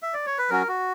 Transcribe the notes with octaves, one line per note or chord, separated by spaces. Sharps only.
E5
D5
C#5
B4
F#3 C#4 F#4 A#4
F#4